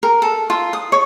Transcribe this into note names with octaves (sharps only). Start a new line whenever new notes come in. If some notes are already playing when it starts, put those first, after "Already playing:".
A#4
A4
F4
D#6
C#5